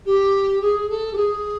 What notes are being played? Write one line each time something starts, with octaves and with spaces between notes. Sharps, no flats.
G4
G#4
A4
G4
G#4